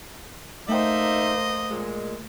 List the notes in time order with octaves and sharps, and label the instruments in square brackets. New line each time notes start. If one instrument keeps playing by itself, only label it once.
[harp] A3 G5 [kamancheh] A#3 C5 [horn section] D#4 E5 [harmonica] D#5
[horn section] A#2 G#3